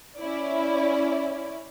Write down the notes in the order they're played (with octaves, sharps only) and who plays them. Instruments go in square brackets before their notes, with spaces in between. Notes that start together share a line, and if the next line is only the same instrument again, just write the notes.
[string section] C#4 E4 D5